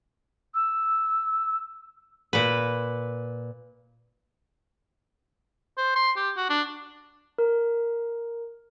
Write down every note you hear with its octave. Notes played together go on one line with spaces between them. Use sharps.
E6
A#2 B4
C5
C6
G4
F#4
D4
A#4